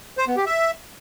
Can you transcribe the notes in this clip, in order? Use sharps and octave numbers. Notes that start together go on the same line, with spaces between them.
C5
B3
G4
E5